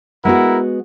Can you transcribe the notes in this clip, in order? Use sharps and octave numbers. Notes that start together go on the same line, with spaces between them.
G#3 B3 E4 F#4 A#4 F#5